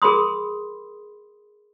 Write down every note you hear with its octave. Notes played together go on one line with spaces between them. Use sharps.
G#4 A#4 B5 C6 D#6